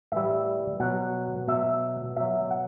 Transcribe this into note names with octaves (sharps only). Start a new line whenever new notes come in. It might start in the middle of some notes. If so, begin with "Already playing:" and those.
A2 E3 G3 E5
B2 F#3 F#5
B2 F#3 E5
B2 F#3 E5
F#5